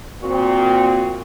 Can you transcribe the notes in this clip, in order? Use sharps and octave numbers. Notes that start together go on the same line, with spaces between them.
A#2 C4 F#4